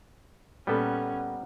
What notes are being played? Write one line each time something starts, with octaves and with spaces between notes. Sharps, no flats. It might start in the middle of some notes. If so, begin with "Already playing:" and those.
A#2 G3 B3 C#4 A4 A#4 F#5